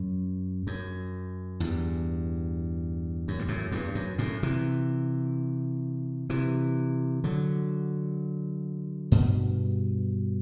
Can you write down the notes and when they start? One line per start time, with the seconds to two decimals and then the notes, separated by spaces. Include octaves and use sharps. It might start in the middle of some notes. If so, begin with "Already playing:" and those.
Already playing: F#2
0.67 F#2
1.60 E2 G2
3.28 F#2
3.39 G2
3.48 F#2 A2
3.72 E2 G2
3.95 F#2
4.18 F#2 A2
4.43 C3 E3
6.30 C3 E3
7.24 D3 F#3
9.12 G2 B2